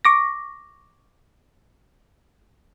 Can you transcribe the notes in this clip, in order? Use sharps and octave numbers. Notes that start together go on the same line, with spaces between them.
C#6 D6 A#6